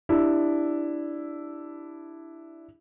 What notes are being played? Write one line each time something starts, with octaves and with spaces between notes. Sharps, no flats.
D4 E4 G4